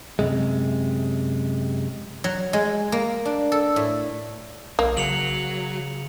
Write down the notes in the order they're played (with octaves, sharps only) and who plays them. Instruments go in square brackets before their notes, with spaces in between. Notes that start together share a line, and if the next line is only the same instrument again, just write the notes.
[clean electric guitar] F#2 C3 G#3
[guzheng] F#3
G#3
A#3
D4
A4
A2
[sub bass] B1 [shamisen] A#3
[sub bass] C#3 [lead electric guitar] F#3 [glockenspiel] C#7 F7 F#7